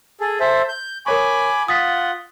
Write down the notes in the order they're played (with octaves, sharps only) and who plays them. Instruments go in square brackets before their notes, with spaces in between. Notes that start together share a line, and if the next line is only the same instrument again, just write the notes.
[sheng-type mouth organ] G#4 A4
A4 C5 E5
G6
[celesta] A#4 C#5 C#6 [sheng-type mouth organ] G#5 B5 D6
[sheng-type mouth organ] F4 F#5 [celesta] D#6 A6 B6